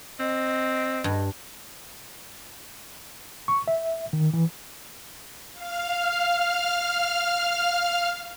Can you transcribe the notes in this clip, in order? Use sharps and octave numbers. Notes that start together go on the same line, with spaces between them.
C4 D#5
G2
C#6
E5
D#3
E3
F5 F6